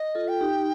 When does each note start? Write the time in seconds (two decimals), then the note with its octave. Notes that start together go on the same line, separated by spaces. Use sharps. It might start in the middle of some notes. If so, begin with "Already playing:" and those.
Already playing: D#5
0.15 F4 A4
0.28 G5
0.41 D#4 G4